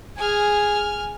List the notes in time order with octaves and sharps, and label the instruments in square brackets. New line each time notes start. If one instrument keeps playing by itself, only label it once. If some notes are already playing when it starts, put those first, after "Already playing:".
[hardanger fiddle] G#4 [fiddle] G#5 F6